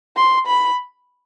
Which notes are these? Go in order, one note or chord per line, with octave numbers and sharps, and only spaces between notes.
C6
B5